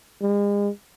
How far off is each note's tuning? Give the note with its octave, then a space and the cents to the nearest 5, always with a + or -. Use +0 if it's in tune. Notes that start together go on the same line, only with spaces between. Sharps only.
G#3 -40